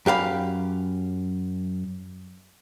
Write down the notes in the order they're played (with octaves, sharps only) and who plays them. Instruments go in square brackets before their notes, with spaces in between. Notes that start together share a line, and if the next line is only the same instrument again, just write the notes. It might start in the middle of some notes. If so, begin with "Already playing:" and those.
[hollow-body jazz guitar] F#2 G4 F5 B5